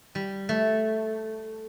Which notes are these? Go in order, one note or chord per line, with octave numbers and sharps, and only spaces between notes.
G3
A3